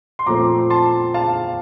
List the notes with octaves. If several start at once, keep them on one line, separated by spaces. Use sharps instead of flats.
C6
A#2 F3 A3 C4 A#5 D6
A5 C6
F5 A5